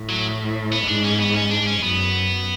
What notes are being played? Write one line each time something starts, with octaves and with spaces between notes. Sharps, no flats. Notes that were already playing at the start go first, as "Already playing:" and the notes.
Already playing: A2
F#3
B3
G#2 D4
C#4
B3
C#4
D4
C#4
F#2 B3